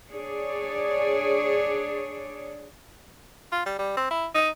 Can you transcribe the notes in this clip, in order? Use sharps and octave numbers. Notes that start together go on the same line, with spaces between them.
D4 G#4 C#5 D5
F4
G3
G3
C4
E4
D#4